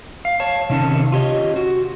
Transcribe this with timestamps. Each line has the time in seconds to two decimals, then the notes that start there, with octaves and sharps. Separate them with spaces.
0.25 F5
0.40 C#5 F5 A5
0.70 C3 D#3 C#4 A5
1.12 F4 G4 C#5 D#5
1.56 F#4